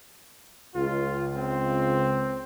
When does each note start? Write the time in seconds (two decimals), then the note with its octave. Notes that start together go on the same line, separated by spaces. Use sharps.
0.75 C#2 F4
1.36 C4